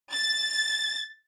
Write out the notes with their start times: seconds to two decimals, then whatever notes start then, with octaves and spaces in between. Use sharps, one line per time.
0.11 A6